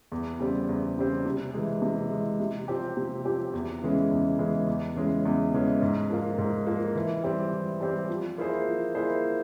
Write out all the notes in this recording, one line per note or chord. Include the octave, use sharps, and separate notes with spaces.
E2
C#3 G3 C4
E2
C#3 G3 C4
C3
E3 G#3
C3
E3 G#3
C3
F3 C4 G4
C3
F3 C4 G4
E2
C#3 E3 G#3 C#4
E2
C#3 E3 G#3 C#4
E2
C#3 E3 G#3 C#4
E2
C#3 E3 G#3 C#4
G#2
F3 A#3 F4
G#2
F3 A#3 F4
E3
G3 C4 G4
E3
G3 C4 G4
F3
A#3 E4 G#4 C5
F3
A#3 E4 G#4 C5